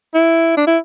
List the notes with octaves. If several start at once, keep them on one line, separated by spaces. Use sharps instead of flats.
E4
D4
E4